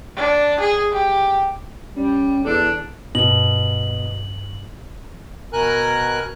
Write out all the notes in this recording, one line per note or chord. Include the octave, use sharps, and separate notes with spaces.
D4
G#4
G4
G3 C#4
E2 D4 A4
G2 B2 F#7
B2 A#4 G#5 F#6